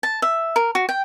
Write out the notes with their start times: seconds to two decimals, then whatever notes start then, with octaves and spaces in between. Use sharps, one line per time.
0.03 A5
0.22 E5
0.56 A#4
0.75 F#4
0.89 G5